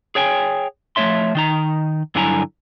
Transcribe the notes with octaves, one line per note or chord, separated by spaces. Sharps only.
G#4 C#5 G5 G#5
F3 A3 C4 C#5 E5 C6
D#3 D#4 A#5
G2 D3 F#3 E4 G#5 A#5